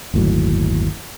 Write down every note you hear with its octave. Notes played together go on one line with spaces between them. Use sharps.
G1 D#2 A2 F#3